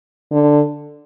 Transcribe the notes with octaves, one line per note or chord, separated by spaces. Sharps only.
D3